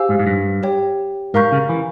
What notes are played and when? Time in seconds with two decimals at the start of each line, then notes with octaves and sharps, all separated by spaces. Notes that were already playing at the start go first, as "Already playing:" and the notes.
Already playing: G4 C5 F5 G#5 E6
0.09 G#2
0.19 G#2
0.27 G2
0.63 G4 C#5 G5
1.34 G#2 A#4 F5 A#5 C#6 G6
1.52 C#3
1.69 E3